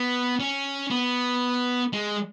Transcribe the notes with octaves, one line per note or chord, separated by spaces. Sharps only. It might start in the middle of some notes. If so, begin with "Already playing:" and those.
Already playing: B3
C#4
B3
G#3